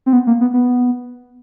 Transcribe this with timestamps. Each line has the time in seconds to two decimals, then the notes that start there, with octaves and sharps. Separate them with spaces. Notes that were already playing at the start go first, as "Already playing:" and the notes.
0.06 C4
0.13 B3
0.27 A#3
0.41 B3
0.54 B3